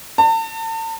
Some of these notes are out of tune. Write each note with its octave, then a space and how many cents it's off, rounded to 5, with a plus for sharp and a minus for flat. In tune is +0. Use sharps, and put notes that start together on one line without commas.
A5 +40